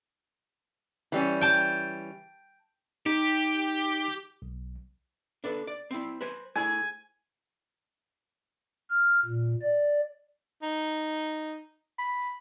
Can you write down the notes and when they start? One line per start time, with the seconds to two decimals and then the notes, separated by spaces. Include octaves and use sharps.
1.12 E3 G3 C#4
1.41 G5 A5
3.06 D#4 G4
4.42 B1
5.44 D4 A4 B4
5.67 D5
5.91 C4 E4
6.21 B4 C5 G#5
6.55 A3 E4 G#4 G#5
8.90 F6
9.25 A#2
9.62 D5
10.63 D#4
11.99 B5